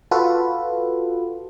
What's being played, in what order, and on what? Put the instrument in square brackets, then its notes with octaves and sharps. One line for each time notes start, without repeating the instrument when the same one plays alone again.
[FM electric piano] F4 F#4 A4 B4